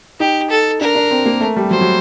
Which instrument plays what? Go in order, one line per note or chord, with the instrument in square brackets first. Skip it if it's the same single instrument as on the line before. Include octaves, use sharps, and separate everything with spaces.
[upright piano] D#4 [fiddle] G4
[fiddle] A4
[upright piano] D4 [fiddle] A#4
[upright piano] D4
C4
A#3
A3
G3
[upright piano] F#3 [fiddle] C5
[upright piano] F#3